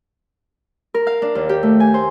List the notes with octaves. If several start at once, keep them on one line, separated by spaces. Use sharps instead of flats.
A#4
F5
D4
D#2
G4
A3
G#5
C5